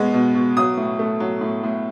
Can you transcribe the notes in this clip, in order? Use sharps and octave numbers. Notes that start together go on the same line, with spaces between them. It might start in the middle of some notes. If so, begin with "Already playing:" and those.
Already playing: B2 G#3 B3
B2
B2
F#3 D#6
A2
A3
F#3
A2
A2